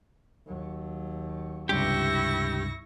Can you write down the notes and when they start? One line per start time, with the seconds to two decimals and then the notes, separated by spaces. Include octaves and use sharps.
0.46 D#2 F#3
1.69 C#2 G2 C3 E4 G4 C#6 A#6